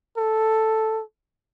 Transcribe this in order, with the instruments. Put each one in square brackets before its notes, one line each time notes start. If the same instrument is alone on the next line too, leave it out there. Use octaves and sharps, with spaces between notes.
[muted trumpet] A4